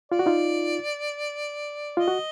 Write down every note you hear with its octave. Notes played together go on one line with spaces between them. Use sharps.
F4 D5
F#4
D#4 F4
F4 D#5
F#4